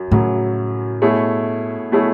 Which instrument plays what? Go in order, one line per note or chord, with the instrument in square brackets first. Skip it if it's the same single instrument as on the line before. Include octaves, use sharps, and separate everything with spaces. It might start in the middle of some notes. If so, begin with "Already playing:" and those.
Already playing: [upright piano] F#2 F#3
[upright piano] F#2 C#3 F#3 [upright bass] A2
[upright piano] B2 A3 E4 G#4 C#5
B2 A3 E4 G#4 C#5